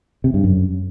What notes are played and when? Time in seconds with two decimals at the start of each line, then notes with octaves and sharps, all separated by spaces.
0.24 C3
0.34 G2
0.44 F#2